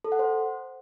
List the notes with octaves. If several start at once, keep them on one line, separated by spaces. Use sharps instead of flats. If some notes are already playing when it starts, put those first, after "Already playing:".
A4
F#5
C5